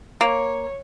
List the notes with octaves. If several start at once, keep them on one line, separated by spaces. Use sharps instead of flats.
A#3 C#5